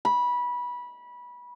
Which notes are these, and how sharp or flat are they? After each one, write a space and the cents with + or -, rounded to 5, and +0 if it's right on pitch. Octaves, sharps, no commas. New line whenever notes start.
B5 -20